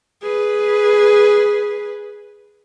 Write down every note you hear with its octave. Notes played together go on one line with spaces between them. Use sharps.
G#4 B4